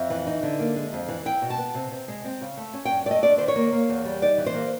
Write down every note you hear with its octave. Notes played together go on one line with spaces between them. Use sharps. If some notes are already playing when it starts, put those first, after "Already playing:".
Already playing: F2 E5
E3
D#4
D3
A#3
G#3
F2
E3
E4 G5
B2
A5
B3
C3
C3
G#3
C4
C#3
A3
C#4
G2 G5
A3 D5 D#5
D4 D5
D#3 C5
C#5
A#3
A#3
E2
G3
D#4 D5
E3
C5
A#3